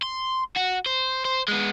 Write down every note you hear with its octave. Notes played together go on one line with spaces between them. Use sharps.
C6
F#4
C5
C5
G#3 B3